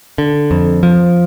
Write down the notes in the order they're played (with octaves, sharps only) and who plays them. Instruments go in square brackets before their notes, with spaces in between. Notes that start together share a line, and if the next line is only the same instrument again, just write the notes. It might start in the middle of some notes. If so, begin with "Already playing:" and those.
[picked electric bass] D3
F2
F3